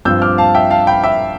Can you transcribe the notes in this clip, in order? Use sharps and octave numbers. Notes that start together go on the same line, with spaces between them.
G2 F3 C4 F4 E6 G6
D6 F6
F5 A5
E5 G5
F5 A5
G5 B5
E5 G5